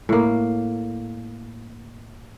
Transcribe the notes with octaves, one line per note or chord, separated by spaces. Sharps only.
A2 A#3